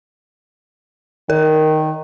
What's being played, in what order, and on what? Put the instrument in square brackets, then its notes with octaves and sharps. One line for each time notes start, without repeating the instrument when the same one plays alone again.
[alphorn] D#3 [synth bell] A#4